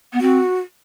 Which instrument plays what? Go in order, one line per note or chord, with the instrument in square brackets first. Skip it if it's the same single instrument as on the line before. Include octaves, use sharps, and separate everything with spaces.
[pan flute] B3
[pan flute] C4 [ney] F#4